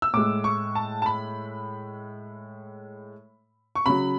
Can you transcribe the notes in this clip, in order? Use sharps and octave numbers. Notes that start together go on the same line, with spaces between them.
E6
A2 G#3 D6
C#6
A5
A5
B5
C#6
C#3 F#3 B5